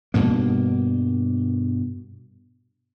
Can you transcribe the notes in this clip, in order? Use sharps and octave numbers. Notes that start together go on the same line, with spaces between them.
G2 B2 A#3